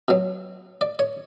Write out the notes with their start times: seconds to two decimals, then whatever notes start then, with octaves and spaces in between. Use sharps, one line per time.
0.08 B2 F#3
0.81 D5
0.99 C#5